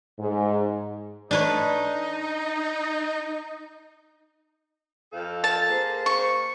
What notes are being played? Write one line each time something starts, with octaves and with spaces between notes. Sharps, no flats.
G#2
D4 D#4 B4 C#5
F2 A4 F5
A5
A#3 G#4 C5
C#6